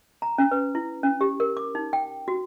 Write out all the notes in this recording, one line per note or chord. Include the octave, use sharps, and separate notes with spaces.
A#5
C#4
B4
E4
C#4
G4
A#4
D6
D#4
G5
F#4